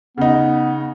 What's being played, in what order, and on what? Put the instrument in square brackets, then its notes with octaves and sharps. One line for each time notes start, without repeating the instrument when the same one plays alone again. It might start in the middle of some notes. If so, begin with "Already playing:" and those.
[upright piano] C#3 D#4 [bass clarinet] B3